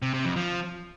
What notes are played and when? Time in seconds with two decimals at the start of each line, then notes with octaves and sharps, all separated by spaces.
0.02 C3
0.14 C3
0.25 F2
0.36 F3